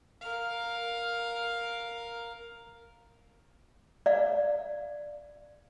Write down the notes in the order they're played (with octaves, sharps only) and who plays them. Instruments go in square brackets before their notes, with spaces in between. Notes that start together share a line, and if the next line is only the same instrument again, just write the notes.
[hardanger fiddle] A#4 F5
[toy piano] D5 F5